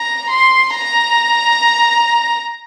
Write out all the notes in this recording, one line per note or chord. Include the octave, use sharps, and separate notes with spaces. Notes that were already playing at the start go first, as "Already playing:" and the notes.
Already playing: A#5
C6
A#5